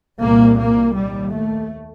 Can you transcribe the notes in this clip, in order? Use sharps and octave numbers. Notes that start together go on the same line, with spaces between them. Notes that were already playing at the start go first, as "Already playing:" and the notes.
C2 A#2 A#3
A#3
D#2 G3
A3